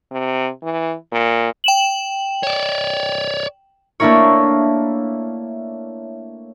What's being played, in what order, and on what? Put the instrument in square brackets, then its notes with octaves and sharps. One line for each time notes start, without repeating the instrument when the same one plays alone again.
[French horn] C3
E3
A#2
[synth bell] G5 E7 F#7
[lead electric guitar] C#5 D5
[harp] A3 A#3 D4 E4 A#4 C#5